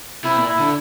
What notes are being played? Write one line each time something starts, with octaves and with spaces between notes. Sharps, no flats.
C3 E4
A#2
E4
D3